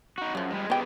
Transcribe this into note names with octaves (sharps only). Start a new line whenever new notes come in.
D#4 F#4
F#2 C#3 F3
G3 G#3
G#3 B3 G4 G#4 G5